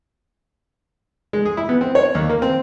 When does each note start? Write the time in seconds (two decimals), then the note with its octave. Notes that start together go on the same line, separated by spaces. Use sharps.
1.33 G#3
1.45 G#4
1.57 E4
1.69 B3
1.81 C4
1.95 C#5
2.15 D#2
2.30 A#3
2.42 C4